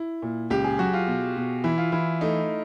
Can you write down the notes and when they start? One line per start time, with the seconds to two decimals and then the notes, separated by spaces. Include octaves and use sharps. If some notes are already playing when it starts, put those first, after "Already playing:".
Already playing: E4
0.22 A#2
0.50 C#2 G4
0.64 G#4
0.79 F#3 F#4
0.93 F4
1.07 B2
1.36 B2
1.64 E3 E4
1.78 F4
1.92 E3 E4
2.21 A3 D#4